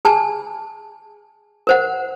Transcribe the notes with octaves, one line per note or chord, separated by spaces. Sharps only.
G#4 G#5 A5
A#4 C5 F#5